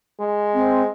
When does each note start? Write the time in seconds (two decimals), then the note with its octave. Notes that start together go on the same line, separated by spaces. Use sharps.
0.20 G#3
0.54 C4